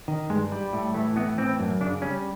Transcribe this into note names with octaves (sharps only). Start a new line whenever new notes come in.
D#3
G2 G#3
G3
A2
E3 A3
A2 B3
E3 C4
F#2
C#3 D4
G3 C#4